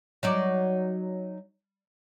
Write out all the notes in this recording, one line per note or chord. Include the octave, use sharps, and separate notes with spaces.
F#3 D#4 D5